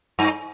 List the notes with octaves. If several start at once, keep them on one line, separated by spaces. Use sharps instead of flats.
G2